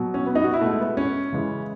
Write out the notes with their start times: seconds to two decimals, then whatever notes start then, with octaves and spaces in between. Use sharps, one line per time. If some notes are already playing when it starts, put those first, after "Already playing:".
Already playing: B2 F#3
0.14 C#4
0.26 B3
0.35 D#4
0.44 F#4
0.53 E4
0.61 B2 G#3 A3
0.80 B3
0.97 C#4
1.32 C#3 E3 G#3